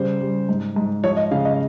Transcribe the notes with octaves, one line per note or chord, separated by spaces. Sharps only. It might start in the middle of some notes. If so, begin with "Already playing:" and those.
Already playing: C#3 G3 C5
G3
G#2
G#2
F3 C#5
D#5
C#3 F5
D#5